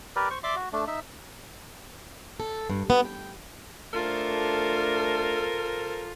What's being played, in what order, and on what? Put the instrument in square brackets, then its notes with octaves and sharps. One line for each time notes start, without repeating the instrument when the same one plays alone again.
[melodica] G4 A#4 B4 D5
C5 C#6
D5 E5 C6 D6
F#4
A3 D4
D#4 E5
[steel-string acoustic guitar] A4
G2
B3
G5
[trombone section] A3 D4 [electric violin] F4 [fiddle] A4 C5 [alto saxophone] A#4